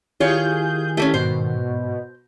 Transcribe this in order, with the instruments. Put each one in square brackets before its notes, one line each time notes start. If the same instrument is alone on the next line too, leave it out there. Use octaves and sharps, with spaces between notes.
[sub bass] D#3 [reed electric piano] E4 G4 [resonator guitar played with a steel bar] F4 C#5 [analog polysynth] G#4 G6
[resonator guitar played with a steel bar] A3 A#3 C#4 [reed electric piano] E4 G4 A4
[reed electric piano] G#2 [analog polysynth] B2 [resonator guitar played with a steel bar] C5